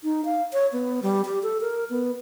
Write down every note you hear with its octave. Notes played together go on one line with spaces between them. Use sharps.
D#4
F5
C#5
B3
G3
G4
A4
A#4
B3